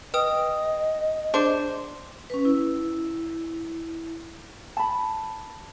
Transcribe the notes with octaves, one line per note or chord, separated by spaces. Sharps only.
B4 D#5 G5 D#6
D4 G#4 C5 D6
C#4 B4
E4
A5 B5